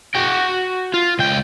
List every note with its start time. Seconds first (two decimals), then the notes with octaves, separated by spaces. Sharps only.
0.15 F#4 G5
0.94 F4
1.19 C#2 G5